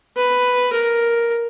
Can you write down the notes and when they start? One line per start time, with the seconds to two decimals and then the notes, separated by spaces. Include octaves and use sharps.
0.17 B4
0.73 A#4